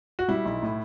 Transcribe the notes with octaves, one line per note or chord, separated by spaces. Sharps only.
F#4
G3 E4
B1
A2